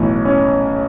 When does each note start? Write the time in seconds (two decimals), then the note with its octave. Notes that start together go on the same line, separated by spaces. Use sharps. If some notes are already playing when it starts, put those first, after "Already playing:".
Already playing: B1 A2 E3
0.25 C#4